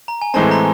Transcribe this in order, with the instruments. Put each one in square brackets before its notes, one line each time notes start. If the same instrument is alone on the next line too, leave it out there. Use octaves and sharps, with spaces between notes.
[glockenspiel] A#5
G#5
[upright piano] A2 E3 G#3 C4 [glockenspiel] A5
[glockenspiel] A#5